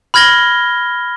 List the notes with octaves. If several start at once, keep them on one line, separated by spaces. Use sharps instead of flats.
B5 F6 G#6 A#6 G7